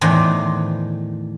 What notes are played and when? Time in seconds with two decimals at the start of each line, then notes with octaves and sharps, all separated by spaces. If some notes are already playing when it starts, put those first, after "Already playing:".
0.01 E2 A2 D#3 D4 C5